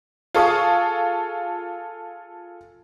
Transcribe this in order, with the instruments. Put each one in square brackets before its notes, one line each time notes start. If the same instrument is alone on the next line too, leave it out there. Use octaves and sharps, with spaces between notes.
[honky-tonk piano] F4 G#4 A4 C#6 D#6